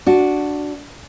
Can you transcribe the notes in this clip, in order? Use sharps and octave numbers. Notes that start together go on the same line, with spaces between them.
D4 F#4